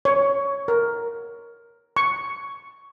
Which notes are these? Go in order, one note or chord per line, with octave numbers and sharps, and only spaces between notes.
C#5
A#4
C#6